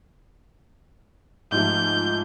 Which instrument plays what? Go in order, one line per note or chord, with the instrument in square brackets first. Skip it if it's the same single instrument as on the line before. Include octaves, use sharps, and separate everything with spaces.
[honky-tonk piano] G#2 F3 A3 [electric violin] G6